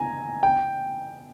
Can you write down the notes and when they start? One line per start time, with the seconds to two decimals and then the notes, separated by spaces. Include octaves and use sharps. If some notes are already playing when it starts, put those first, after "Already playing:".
Already playing: G#5 A#5
0.43 G5